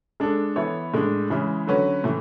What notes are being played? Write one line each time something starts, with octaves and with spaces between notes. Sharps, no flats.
G#3 D4 A4
E3 B3 E4 A4 C#5
A2 G#3 D4
C#3 E3 G#3
D3 F#3 C#4 F#4 B4
A2 E3